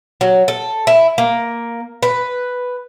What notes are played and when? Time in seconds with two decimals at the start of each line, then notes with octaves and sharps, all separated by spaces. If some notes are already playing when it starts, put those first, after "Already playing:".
0.21 F#3
0.48 A4
0.87 E4
1.18 A#3
2.03 B4